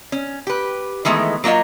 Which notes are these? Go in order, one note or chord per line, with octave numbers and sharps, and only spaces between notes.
C#4
G4 B4
D#3 E3 G#3 A3 B3
F#3 A#3 F4 F#4 D#5